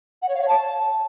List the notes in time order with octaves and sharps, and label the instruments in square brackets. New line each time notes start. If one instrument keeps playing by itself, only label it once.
[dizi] F#5
C#5
F5
C#5
A5